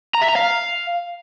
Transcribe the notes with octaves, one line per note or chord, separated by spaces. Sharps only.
A#5
E5
A#5
F5